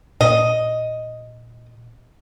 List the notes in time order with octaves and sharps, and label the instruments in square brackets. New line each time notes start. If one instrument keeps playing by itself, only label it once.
[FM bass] A#2 [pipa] D#5